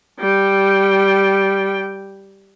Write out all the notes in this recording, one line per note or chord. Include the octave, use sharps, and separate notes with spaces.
G3 G5